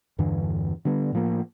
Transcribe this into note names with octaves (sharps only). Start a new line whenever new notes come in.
E2 G2 D3 E3
D3 G3 B3
A2 F3 A#3